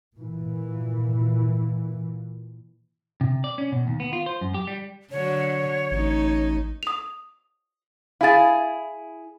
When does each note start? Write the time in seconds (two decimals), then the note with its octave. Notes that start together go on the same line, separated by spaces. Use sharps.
0.18 A#2 E3
3.21 C3
3.44 D5
3.58 C#4
3.72 B2
3.87 D#2
4.00 B3
4.13 F4
4.26 C5
4.41 F#2
4.54 G4
4.67 G3
5.12 D3 F#3 C#5
5.91 A1 A3 D#4
6.83 D#6 F7
8.21 E4 G#4 F5 A6